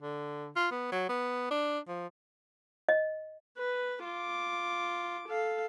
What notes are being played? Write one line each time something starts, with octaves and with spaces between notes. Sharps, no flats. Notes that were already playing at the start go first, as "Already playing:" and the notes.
D3
F4
B3
F#3
B3
D4
F3
D#5
B4
F4 D6
A4 F5